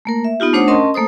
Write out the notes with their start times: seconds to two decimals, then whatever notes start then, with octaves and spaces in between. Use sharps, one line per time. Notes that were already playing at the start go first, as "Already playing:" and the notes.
0.05 A3 A#3 A#4
0.25 E5
0.40 B3 D#4 F4 G4
0.53 A3 D4 C5 C#5 F#5 D#6
0.68 C#4 A#4 D#5 A5 C6
0.94 A3 A#3 A4 C5 D#6